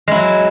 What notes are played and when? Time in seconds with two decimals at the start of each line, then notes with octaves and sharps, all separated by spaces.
0.08 G#3
0.12 E4
0.15 F#3